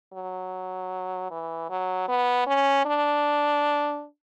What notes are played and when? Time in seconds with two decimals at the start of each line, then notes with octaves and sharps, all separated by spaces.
0.13 F#3
1.31 E3
1.70 F#3
2.08 B3
2.47 C#4
2.86 D4